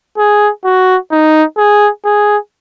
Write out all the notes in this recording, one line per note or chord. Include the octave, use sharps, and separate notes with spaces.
G#4
F#4
D#4
G#4
G#4